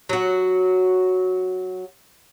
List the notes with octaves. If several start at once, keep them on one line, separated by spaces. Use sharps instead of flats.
F#3 F#4